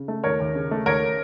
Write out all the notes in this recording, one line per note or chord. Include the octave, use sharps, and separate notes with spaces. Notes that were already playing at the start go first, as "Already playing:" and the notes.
Already playing: C#3
A3
D#2 A#4 C#5
D#2
C#3
A3
D#2 A#4 C#5